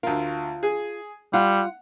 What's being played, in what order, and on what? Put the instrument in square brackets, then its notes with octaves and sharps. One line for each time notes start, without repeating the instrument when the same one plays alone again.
[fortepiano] D2 A#4 [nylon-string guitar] F4
[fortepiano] G#4
[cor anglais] G3 [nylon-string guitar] F4 [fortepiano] F#5